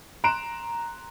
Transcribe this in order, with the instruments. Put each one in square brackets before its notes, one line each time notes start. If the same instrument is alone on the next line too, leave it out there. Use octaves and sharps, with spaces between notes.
[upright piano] A#5 C6 F#6 D7 E7